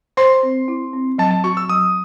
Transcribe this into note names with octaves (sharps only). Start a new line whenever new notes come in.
C5 C6
C4
E4
C4
F#3 A5
A5
F#4 C#6
E6
F#3 D#6